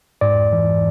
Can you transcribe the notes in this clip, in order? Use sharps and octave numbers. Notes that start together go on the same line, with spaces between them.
G#2 D5
E3